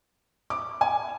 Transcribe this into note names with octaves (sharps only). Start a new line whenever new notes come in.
D6
G#5